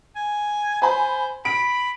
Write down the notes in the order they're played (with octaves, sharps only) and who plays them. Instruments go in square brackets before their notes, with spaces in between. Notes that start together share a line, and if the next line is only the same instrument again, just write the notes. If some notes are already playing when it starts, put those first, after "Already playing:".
[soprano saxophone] G#5
[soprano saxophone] C5 [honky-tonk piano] G#5 B5
[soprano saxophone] B5 [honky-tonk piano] D7